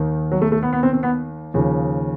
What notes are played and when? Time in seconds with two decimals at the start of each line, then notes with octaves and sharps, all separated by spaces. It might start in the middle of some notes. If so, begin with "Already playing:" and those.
Already playing: D#2 D#3
0.32 F#3
0.42 A3
0.52 A3
0.63 B3
0.73 B3
0.83 C4
0.93 C4
1.03 B3
1.54 D#2 C#3 F3